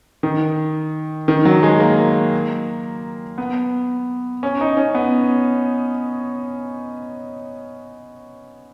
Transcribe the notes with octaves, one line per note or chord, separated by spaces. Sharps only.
D#3
D#3
F#3
G#3
A#3
B3
C#4
D#4
C#4
B3